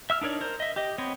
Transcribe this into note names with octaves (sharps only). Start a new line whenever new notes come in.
E5 E6 F6
D4 D#4 A#4 C#5 D5
A#4 C5
D#5 E5
G4 D#5
B3 C4 C#5 D#5